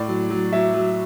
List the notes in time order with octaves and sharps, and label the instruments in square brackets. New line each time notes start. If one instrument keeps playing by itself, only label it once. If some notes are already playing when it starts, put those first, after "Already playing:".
Already playing: [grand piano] A2 D5
F#3
F#3
F#3 E5
F#3